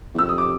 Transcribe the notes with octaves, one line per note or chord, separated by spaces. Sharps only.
E2
F2 E6
D#6
D6